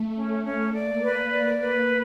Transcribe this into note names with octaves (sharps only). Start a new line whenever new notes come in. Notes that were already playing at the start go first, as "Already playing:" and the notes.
Already playing: A3
C#4
C#4
A#3 D5
B4
D5
B4